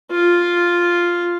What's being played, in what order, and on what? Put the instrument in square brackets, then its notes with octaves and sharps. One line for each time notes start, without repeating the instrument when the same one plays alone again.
[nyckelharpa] F4